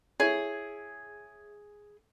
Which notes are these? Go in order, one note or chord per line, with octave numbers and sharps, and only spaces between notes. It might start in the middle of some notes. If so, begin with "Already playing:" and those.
E4 G#4 C#5